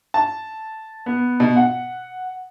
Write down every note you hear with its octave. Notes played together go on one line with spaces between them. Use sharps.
A5
B3
B2
F#5